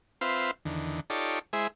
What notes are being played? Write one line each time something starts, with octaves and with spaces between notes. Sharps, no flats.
C4 F4 B4 C5 E5 F5
E2 D3 D#3
D#4 F4 G4 A4 C#5 D5
G#3 E4 G#4 C5 E5